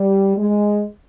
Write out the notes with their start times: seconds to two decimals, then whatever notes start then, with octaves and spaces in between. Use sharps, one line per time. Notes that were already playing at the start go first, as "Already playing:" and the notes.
Already playing: G3
0.38 G#3